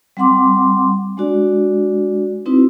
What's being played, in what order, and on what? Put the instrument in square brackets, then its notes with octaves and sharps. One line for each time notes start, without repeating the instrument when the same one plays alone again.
[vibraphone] G3 C4 F#5 C6 D6
G#3 D4 F#4 D5
C4 D#4 E4 F#4 B4